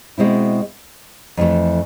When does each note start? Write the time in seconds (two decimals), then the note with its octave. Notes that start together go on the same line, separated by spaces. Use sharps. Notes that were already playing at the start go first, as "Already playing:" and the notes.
0.18 B2 G#3 C4 E4
1.37 F2 E3 A3